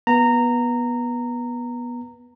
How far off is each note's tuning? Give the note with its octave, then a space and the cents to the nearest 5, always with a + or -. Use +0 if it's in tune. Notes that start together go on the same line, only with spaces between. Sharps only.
B3 -20 A#5 -15